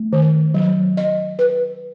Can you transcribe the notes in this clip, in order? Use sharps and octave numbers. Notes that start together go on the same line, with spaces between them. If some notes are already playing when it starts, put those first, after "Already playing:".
Already playing: A3
D#3
F#3
D#5
B4